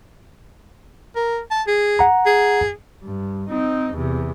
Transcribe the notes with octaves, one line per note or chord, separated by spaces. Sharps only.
A#4
A5
G#4
F#5 A#5
G#4
G2
C4 D#4
E2 C3